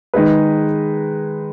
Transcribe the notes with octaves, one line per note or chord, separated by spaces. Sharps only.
D#3 G#3 D#4 G#4 B4